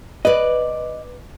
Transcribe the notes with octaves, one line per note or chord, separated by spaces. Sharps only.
B4 D5 D#5